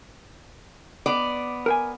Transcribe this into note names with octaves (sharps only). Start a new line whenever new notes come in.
B3 D5
A#4 G5 G#5